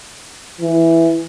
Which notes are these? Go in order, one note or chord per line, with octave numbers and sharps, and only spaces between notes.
E3